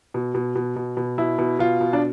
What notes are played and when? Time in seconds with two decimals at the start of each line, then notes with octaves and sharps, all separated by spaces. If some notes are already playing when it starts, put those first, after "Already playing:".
0.14 B2
0.35 B2
0.55 B2
0.76 B2
0.97 B2
1.18 B2 E4
1.38 B2
1.59 B2 F4
1.81 B2
1.93 D4